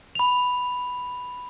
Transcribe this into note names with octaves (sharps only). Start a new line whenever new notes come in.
B5 F7